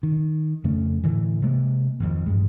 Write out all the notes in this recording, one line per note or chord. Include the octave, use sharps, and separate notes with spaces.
D#3
F2 C#3 A3
A2 D3 E3
C3 G#3 A#3
G#1 F2
A1 G2 G#3